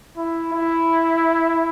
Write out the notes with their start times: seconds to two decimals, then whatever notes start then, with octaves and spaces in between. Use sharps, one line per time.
0.17 E4
0.53 E4